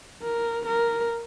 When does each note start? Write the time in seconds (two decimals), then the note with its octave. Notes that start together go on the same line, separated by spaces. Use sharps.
0.23 A#4
0.66 A#4